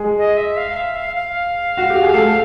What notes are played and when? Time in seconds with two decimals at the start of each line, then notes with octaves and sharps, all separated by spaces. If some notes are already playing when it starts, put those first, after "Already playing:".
Already playing: G#3 G#4
0.18 D#5
0.37 E5
0.57 F5
0.76 E5
0.96 F5
1.16 F5
1.77 F#4
1.90 G4
2.03 G#4
2.14 A3 A4